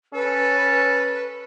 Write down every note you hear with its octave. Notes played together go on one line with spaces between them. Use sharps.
C#4 A4 B4